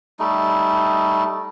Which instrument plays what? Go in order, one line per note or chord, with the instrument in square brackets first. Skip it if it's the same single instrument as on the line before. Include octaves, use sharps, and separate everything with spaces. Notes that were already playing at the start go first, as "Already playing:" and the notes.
[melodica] G3 A3 D#4